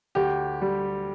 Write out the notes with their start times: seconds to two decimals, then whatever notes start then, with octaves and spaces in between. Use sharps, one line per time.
0.15 D2 G4
0.62 G3